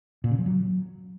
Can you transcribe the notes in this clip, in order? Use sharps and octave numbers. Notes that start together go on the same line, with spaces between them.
A#2
C#3
F3
F#3